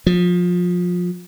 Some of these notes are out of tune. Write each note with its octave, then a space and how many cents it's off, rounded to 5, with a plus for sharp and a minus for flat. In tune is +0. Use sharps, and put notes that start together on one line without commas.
F3 +25